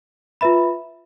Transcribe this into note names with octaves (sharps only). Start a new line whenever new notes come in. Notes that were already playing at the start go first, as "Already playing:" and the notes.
F4 B4 E5 B5